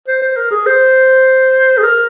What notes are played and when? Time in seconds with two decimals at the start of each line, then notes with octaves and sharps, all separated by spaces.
0.08 C5
0.22 C5
0.37 A#4
0.51 G#4
0.66 C5
1.78 G#4
1.83 A#4